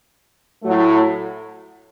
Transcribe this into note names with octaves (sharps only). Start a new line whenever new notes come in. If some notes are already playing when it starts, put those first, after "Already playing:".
A2 F#3 A3